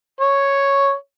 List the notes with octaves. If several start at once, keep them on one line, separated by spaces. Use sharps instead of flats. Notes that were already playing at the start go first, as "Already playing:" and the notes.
C#5